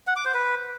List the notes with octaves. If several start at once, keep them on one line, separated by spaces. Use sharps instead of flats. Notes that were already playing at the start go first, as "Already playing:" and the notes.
F#5
D6
C5
B4